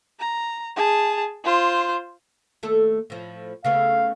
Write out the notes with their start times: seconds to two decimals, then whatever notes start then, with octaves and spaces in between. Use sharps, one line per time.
0.20 A#5
0.76 G#4 A5
1.44 F4 C5
2.63 D#2 A3 A4
3.10 A2 F3
3.64 C#3 A3 B3 F5